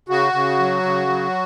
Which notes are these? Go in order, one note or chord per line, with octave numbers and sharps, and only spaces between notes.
C#3 F#4
C#3
F#3
C#3
F#3